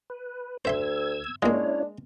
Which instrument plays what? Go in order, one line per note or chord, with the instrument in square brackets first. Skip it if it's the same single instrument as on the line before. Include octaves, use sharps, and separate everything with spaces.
[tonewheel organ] B4
[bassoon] D2 [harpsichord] C5 E5 C6 [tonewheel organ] E6 G#6
[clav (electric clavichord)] G#3 [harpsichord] A#3 F4 [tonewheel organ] C#4 E4 C#5 [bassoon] D4